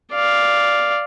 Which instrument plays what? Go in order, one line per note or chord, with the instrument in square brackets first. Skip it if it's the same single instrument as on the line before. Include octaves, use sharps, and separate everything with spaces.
[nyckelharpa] D5 F5